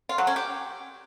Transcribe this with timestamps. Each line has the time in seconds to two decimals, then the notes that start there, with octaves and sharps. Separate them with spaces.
0.09 F4
0.18 F#3
0.27 C#4
0.36 G4